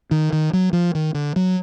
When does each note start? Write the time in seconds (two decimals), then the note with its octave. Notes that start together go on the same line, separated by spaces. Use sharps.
0.11 D#3
0.33 D#3
0.53 F#3
0.73 F3
0.95 D#3
1.14 D3
1.36 F#3